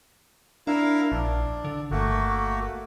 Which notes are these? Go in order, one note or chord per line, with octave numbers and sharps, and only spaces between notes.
D4 E4 A#4 F5
A#1 D4
D3
G1 A3 A#3 F#4